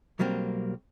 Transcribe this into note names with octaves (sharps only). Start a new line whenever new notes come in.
B1 F#3 G3 A#3 C4